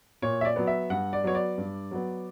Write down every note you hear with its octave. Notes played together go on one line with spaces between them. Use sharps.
A#2 C#5
E5
D5
F#3 B3
E5
G2 F#5
D5
F#3 B3 C#5
D5
G2
F#3 B3